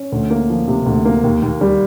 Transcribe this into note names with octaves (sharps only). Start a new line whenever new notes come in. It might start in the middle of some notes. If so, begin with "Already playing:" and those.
Already playing: C#4
D2
A#3
F3
C3
D2
A#3
D#2
D#2
G3